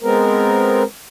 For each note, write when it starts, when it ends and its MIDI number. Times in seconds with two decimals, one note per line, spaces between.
0.01 0.83 56
0.01 0.83 59
0.01 0.83 60
0.01 0.83 70